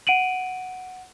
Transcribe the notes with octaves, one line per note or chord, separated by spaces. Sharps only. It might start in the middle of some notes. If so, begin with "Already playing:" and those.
F#5 D7 D#7 F#7